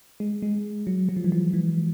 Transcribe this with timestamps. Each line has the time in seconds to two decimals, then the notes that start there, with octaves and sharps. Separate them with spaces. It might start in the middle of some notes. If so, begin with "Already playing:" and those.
0.20 G#3
0.42 G#3
0.87 F#3
1.09 F#3
1.17 F3
1.24 E3
1.32 F3
1.53 E3